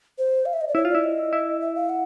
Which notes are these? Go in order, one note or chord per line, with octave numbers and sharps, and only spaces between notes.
C5
F5
E5
D#5
D5
E4 C#5
F4
D5
E4
D#5
E4
E5
F5
F#5